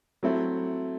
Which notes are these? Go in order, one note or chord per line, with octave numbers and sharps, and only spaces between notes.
F#3 A3 C4 E4 A4